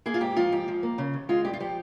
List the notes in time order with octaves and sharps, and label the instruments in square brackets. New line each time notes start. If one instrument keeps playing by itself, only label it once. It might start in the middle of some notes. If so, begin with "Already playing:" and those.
[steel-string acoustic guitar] A#3 G#4
F4
G#2 G4
F3 F4
G#2 G4
F3
A#3
C#3
D#2
G#3 F4
G2 G4
F4
F3 G4